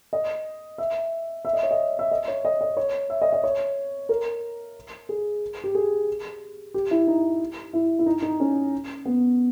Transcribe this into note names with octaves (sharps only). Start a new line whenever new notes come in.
D#5
E5
E5
D#5
C#5
D#5
E5
D#5
C#5
D#5
D#5
C#5
E5
D#5
D#5
C#5
A#4
G#4
G4
G#4
G4
E4
D#4
E4
E4
D#4
D#4
C#4
B3